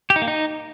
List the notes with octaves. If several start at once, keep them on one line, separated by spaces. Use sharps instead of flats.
G4
D#4
A#3
D#4